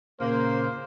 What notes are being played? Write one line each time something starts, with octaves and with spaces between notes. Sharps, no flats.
A#2 C#3 A#3 C#4 C5